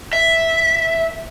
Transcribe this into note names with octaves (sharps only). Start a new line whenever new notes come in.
E5